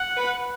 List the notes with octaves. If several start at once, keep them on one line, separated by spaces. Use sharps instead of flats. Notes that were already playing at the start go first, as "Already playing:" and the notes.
Already playing: F#5
B4